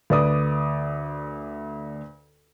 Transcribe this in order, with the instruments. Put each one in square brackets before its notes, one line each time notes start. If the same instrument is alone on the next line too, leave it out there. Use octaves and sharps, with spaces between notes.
[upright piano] D2 B4 D5 D6 D#6